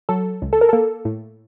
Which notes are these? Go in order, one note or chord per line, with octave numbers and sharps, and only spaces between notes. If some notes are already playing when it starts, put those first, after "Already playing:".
F#3 A4
C#2
A4
A#4
A#3 A4
A2